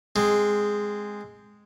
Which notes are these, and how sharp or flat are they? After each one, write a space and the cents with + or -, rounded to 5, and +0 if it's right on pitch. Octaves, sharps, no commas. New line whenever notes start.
G#3 -5 C4 +0